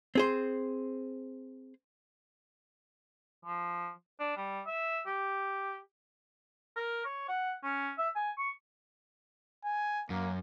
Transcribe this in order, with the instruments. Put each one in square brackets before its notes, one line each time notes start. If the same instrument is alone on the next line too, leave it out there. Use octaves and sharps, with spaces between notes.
[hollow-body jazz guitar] C4 G#4 C5
[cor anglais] F3
D4
G3
E5
G4
[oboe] A#4
C#5
F#5
C#4
E5
G#5
C#6
[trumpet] G#5
[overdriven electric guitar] F#2 [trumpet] A#3